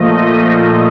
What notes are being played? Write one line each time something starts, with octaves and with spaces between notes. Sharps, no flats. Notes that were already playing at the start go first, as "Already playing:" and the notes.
Already playing: A#2 F3 A3 D#5
D#5